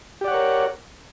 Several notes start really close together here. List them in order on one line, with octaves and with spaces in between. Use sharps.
G4 D5 F#5 C#5 A#4